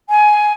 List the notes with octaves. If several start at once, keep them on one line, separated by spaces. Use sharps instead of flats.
G#5